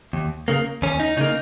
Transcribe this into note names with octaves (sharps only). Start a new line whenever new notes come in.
D#2
C#3 A#3
D#2 C#4
D#4
C#3 A#3 D#4